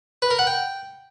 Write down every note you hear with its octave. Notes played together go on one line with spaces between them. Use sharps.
B4
A#4
F#5
G5